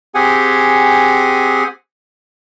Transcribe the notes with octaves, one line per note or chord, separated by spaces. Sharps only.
C4 G4 G#4 F#5 G#5